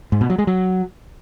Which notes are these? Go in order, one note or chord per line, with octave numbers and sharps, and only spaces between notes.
G#2
B2
F#3
G#3
F#3